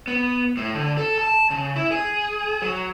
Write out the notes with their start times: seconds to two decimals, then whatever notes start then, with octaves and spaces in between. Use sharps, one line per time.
0.08 B3
0.57 A2
0.74 D3
0.97 A4
1.18 A5
1.50 C#3
1.76 E4
1.91 G#4
2.62 F#3